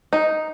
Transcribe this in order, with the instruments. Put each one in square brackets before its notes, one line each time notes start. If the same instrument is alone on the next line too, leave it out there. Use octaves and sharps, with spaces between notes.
[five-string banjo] D#4